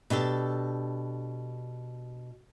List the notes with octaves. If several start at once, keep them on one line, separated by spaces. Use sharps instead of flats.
B2 D4 G4 A4